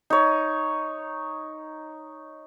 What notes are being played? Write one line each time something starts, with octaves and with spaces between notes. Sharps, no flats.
D#4 C#5